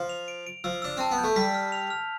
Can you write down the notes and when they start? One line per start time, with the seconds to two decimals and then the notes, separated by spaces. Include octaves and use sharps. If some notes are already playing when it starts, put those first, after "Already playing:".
Already playing: F3
0.09 F7
0.28 D7
0.47 D7
0.64 F3 E6
0.82 D4 E6
0.97 C4 A5
1.11 B3
1.18 G6
1.23 A3
1.36 G3 B6
1.54 F6
1.72 F7
1.90 F6